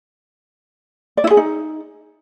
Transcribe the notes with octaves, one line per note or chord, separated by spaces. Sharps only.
D5
E4
G#4
D#4